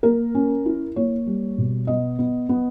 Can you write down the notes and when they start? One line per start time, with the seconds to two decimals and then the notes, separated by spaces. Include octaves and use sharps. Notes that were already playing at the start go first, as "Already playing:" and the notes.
0.03 A#3 A#4
0.35 C#4
0.66 E4
0.96 A#3 C#5
1.26 G3
1.58 B2
1.87 B3 D#5
2.19 B3
2.49 B3